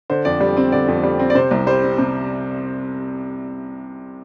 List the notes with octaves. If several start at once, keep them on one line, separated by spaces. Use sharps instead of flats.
D3 C5
F2 D5
G3
C4
D3 D5
F2
G3
C4
D5
C3 C5
C2
G3 C5
C4
C3